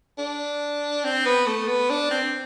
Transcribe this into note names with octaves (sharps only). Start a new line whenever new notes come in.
D4
C4
B3
A3
B3
D4
C4